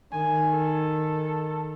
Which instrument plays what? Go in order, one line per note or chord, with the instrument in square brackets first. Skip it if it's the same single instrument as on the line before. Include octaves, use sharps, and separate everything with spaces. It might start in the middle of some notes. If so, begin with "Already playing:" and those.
[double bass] D#3 [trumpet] G#5
[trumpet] A4